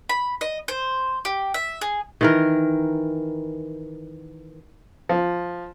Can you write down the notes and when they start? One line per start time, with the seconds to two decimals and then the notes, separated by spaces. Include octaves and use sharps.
0.09 B5
0.41 D#5
0.68 C5
1.25 G4
1.54 E5
1.81 G#4
2.21 D#3 E3 A#4
5.09 F3